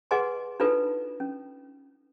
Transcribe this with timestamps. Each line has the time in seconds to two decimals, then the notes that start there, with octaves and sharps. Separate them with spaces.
0.11 G#4 B4 D#5 F#5 G#5 C6
0.60 D4 D#4 F4 F#4 A4 B4
1.20 C#4